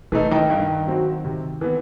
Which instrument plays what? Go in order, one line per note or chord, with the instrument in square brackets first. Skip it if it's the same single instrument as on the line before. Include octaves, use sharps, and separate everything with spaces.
[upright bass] C3 [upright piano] E3 A3 D#4 A4
[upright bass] D#3
[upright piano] G2
F#3 C4 F#4
C3
E3 B3